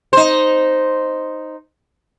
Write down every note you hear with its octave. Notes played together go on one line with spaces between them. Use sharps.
D#4 C5